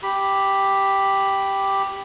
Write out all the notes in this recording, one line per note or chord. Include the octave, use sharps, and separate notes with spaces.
G4 B5